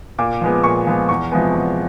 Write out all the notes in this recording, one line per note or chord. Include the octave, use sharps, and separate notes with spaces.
A#2 D6
F3 G#3 B3
A#2 C#6
F3 G#3 B3
E2 C#6
C3 F3 G#3 B3
E2